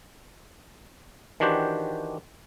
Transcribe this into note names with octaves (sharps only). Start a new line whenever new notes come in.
D#3 E3 D4 F#4 G4 C5